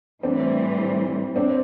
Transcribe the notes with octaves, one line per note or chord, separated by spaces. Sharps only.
A2 E3 G3 C4 D4
C4 D4